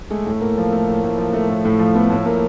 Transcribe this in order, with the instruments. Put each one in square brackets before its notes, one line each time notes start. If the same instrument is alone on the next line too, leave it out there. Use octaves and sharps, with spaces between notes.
[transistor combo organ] G#3 [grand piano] A3
[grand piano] A2
[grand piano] A2 [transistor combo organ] A#3
[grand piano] F3
A3
A2
A2
F3
A3
A2
A2
F3
[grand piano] A3 [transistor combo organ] B3
[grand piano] A2
[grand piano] A2 [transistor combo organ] A#3